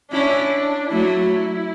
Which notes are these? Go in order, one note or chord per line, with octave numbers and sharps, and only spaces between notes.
C#4 D4 E4
F#3 A3 E4